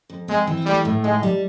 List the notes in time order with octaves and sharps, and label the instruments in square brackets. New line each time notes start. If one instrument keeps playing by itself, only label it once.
[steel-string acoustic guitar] F2
[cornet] G#3 [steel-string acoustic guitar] C4
[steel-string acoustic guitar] E3
[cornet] G3 [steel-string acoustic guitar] A3
[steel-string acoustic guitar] A2
[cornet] G#3 [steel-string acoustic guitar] D#4
[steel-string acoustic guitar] G3